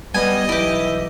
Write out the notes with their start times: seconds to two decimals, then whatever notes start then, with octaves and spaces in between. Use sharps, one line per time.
0.14 G3 B3 D#5 G#5
0.49 B1 E3 E4 G4